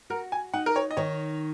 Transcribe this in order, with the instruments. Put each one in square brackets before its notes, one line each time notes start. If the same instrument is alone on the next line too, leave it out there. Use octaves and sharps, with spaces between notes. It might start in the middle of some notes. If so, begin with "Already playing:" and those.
[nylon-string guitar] F#4 [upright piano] A#4
[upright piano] G#5
[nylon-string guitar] D#4 [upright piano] F#5
[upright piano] A#4
C#5
D#5
[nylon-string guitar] D#3 [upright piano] C#5